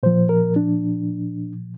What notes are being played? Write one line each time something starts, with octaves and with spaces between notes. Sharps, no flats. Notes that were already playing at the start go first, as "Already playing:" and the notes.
A#2 F3 C5
A#4
D4